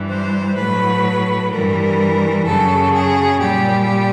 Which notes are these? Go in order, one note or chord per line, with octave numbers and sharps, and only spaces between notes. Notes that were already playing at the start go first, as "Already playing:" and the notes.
Already playing: G2 E3 G3
C5
A2 F#3 B4
G2 E3 G3 A#4
F#2 C#3 F#3 A4
G#4
A#2 G3 G4